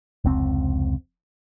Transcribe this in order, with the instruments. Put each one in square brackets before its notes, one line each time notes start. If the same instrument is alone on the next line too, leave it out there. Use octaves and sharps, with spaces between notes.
[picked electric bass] F1 C#2 C4